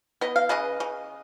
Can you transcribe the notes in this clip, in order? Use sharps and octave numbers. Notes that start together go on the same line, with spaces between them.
B3 D#5
F5
C#3 B4 D#5
C#3